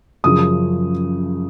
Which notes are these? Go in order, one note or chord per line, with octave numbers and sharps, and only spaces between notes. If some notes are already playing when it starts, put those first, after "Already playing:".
F#2 C#3 F3 D#6